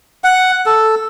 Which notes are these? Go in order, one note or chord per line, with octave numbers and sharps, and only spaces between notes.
F#5
A4